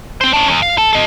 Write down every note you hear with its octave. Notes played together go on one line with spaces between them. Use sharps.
C4 C5
C#4 D4
E2
F5
A4
A4 D#5